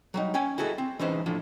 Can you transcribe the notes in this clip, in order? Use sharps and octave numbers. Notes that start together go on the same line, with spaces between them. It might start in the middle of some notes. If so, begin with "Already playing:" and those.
F#3 G3 D#4
C#4 G5 G#5
E4 F#4 G#4 A4 D#5
C4
E3 G#3 C#4 D#4 B4 C5
A2 F3 D4